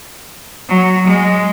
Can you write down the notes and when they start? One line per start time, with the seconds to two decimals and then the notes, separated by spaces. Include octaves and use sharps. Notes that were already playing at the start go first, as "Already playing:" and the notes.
0.69 F#3
1.08 G#3